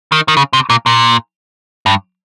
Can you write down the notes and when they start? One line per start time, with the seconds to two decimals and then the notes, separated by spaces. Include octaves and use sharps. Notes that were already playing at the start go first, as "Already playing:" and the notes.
0.12 D#3
0.28 D#3
0.37 C#3
0.53 C3
0.70 A#2
0.86 A#2
1.86 G2